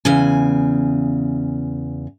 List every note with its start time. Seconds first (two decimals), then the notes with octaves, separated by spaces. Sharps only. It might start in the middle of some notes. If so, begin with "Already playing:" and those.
0.05 E2 C#3 G#5